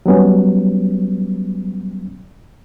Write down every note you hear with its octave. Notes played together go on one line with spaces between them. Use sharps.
F#3 G3 B3 C#4